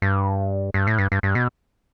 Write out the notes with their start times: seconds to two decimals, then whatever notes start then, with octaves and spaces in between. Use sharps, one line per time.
0.02 G2
0.74 G2
0.87 A2
0.99 G2
1.12 G2
1.23 G2
1.35 B2